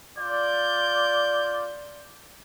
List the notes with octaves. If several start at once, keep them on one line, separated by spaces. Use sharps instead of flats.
F4 D5 G6